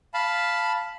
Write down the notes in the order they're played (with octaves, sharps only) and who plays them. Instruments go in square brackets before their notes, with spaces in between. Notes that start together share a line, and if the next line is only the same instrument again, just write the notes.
[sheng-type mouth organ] F5 A5 B5